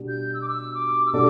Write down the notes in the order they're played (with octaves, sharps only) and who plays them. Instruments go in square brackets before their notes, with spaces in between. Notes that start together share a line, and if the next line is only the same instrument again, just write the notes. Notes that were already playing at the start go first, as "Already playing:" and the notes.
Already playing: [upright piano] B2 G3 D4
[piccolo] G6
E6
D6
E6
D6
E6
[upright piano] B2 G3 D4 A4 [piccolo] D6